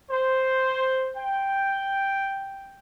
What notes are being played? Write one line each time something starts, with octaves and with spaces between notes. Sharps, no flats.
C5
G5